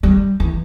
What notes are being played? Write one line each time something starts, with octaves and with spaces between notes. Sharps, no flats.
G3
E3